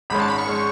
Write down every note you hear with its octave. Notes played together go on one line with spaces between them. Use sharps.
G#1 G#2 G#3 C#4 B5
A5
B5
C#6
G#3 C#4